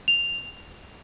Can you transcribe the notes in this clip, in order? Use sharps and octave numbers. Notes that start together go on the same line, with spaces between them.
F7